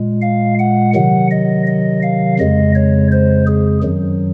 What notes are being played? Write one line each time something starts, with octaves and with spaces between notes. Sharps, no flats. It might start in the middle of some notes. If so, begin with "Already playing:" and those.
Already playing: A#2 G#3
F5
F#5
C3 D#3 F#3 F#5
D#5
D#5
F5
F2 C#3 G#3 D#5
C#5
C5
G#4
F#2 D#3 F#3